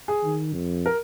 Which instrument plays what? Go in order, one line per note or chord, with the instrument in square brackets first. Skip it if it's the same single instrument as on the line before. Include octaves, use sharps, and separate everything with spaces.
[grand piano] G#4
[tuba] D#3
F2
[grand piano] A#4